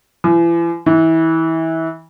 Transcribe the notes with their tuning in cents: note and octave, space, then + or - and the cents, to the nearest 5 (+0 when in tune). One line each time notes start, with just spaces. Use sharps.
E3 +40
E3 -25